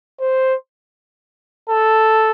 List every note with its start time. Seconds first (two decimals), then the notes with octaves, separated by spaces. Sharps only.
0.20 C5
1.69 A4